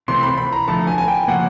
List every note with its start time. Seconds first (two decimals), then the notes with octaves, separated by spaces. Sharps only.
0.08 C3 E3 A3 C4 C6
0.23 B5
0.38 B5
0.52 A#5
0.68 D3 F3 A3 A5
0.87 G#5
0.98 G#5
1.08 G5
1.28 C#3 F3 A#3 F#5